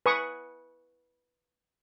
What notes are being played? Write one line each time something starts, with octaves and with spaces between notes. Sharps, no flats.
B4 G#5 C#6 D#6